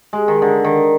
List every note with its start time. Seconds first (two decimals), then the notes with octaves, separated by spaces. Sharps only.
0.13 G#3
0.28 D#3
0.42 D3
0.64 D#3